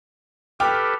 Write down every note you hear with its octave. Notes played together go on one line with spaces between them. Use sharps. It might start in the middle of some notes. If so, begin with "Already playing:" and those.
G4 A4 B4 G5 D6 F6